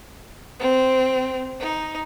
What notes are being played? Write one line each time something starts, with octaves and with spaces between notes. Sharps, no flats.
C4
D#4